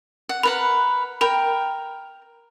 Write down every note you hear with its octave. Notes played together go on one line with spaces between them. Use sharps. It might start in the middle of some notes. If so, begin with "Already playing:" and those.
F#5
A#4 B4 F#5 B5
A#4 G5 B5